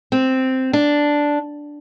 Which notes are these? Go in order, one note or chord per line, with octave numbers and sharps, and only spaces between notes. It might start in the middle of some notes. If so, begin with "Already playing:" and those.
C4
D4